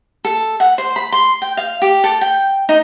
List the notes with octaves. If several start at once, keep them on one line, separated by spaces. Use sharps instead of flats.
A4
F#5
C5
B5
C6
G5
F5
G4
A4
G5
D#4